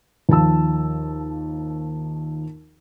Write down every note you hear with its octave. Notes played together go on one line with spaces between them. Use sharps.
D#2 F3 A5 E6